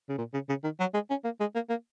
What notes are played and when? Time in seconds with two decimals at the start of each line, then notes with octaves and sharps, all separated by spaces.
0.09 C#3
0.18 A#2
0.34 C#3
0.49 C#3
0.64 D#3
0.80 F#3
0.94 G#3
1.10 C#4
1.24 A#3
1.40 G#3
1.55 A#3
1.70 A#3